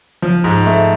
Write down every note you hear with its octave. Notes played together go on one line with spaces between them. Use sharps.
F3
G#2
A3